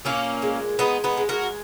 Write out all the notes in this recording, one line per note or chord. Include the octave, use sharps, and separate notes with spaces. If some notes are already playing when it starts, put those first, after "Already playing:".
A#2 A#3 C#4
G#3
G#3 B3 D#4
B3 D#4
G#3
F#4 A#4